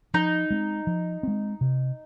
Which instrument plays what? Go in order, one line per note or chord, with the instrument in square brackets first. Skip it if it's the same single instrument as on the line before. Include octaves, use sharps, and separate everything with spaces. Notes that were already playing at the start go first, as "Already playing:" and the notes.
[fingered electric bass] F3 [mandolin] D#4
[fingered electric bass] G#3 C4
F3
G#3 C4
C3